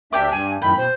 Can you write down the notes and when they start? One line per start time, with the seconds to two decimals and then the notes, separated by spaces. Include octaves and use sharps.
0.13 D2 D4 G4 E5 G5 D6
0.31 G2 G#5
0.62 F#2 A2 D#3 G5 B5
0.77 B2 C5